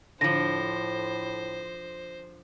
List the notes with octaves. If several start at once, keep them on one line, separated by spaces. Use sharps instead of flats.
A2 D3 F3 C5 A#6